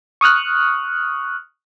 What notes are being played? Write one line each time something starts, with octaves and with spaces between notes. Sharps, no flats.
C#6 D#6 F6 F#6